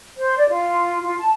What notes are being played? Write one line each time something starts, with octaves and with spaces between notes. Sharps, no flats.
C5
D5
F4
F4
A5